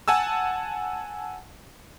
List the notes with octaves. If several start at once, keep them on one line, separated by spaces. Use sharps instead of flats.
F#5 G#5 A5 E6